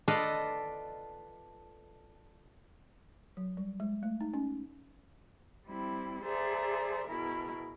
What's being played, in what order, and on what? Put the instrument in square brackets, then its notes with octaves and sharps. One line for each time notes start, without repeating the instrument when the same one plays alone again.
[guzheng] F4 A4 B4 D5 D#5 F5
[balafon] F#3
G3
G#3
A3
D#4
C#4
[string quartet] G3 C4 E4
G#4 A4 C5 D5 E5 A#5
B2 E4 G#4 A#4